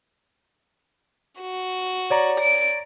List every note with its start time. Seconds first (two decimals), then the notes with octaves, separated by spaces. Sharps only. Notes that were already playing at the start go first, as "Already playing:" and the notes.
1.41 F#4
2.10 C#5 D5 A#5
2.40 D7